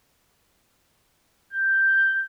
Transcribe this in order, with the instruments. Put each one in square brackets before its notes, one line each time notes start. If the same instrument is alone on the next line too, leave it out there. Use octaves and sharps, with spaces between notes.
[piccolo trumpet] G6